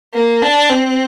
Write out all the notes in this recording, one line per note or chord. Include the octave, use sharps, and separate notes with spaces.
A#3
D4
C4